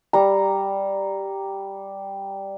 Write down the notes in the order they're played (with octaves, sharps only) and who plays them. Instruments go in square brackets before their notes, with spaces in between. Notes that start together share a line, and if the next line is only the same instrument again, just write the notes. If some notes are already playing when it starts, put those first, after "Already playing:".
[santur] G3 A#5